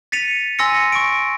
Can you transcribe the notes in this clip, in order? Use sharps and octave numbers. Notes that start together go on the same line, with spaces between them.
A6 B6 C#7 D#7 F7
G#5 C6 E6 A#6 C#7
C#6 D7